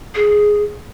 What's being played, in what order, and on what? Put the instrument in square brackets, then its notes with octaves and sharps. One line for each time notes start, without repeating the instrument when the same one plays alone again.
[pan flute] G#4